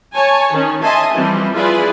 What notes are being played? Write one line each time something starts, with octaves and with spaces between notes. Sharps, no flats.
C#5 G#5 A5
D#3 C#4
D#5 E5 G#5 A5 C6
E3 F3 G3 C4
E4 F4 G#4 B4 D5